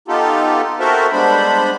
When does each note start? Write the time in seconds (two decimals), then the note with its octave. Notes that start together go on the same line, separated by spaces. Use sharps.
0.08 B3 D#4 F4 G4 A4
0.80 C4 F#4 A4 A#4 C5 E5
1.12 G3 G#3 B3 D4 C5 B5